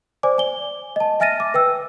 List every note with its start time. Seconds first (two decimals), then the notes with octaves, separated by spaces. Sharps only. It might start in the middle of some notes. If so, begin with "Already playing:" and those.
0.23 C5 D5 G#5 D6
0.38 G#5 G7
0.96 D#5 A5
1.20 E5 G#5 F6 A6 A#6 D#7
1.40 D6
1.54 B4 G5 E6